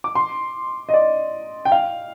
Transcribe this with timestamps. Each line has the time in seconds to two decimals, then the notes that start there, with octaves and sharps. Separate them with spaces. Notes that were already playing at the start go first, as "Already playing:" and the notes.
0.04 D6
0.15 C6
0.89 D#5
0.94 D5
1.65 G5
1.72 F5